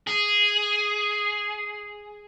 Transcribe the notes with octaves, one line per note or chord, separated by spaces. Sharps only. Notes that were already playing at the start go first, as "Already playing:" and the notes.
G#4